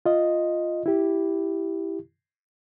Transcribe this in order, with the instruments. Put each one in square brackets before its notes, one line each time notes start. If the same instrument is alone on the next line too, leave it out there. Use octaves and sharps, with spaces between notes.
[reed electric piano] F4 D#5
E4 G4